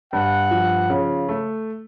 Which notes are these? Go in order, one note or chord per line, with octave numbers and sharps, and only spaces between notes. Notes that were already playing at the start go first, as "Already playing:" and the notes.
G2 F#5
F3
C#3
A3